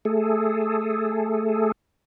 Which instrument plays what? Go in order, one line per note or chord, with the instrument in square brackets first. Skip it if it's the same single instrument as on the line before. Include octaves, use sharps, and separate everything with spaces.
[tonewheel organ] A3 G#4 A4